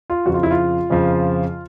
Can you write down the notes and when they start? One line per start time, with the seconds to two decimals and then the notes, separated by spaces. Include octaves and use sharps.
0.10 F4
0.26 F2 C#3 F3 F#4
0.34 F4
0.43 E4
0.51 F4
0.90 F2 C#3 F3